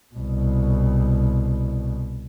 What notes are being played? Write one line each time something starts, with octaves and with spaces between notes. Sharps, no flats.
C2 B2